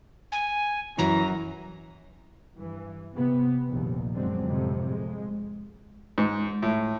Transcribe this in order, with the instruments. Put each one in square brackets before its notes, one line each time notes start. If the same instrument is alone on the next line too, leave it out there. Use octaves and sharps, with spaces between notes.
[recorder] G#5
[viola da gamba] F#2 [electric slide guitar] E3 [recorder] A#5
[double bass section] G2 E3
C3 B3
F1 A#1 D#2
F#2 D3 F#3 G#3 C4
F2 A2 C3
F2 G#3
[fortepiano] G#2
A2